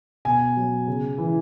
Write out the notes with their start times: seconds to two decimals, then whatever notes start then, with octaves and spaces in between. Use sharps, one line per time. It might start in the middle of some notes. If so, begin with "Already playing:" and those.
0.25 B2 G#5
0.57 F#3
0.87 C#3
1.18 E3